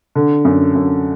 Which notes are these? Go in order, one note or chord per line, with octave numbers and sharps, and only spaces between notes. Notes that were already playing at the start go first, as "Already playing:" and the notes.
D3
F#2
F#2